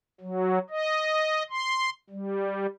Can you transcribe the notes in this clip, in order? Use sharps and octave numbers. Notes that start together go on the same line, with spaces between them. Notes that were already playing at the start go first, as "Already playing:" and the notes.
F#3
D#5
C6
G3